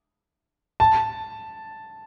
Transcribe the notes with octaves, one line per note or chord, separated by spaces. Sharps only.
A5